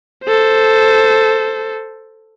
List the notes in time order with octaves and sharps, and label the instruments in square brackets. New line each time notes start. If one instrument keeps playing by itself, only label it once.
[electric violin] A4 C5